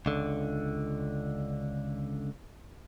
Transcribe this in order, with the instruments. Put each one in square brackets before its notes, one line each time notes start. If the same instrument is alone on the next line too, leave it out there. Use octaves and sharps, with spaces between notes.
[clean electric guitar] C#2 D3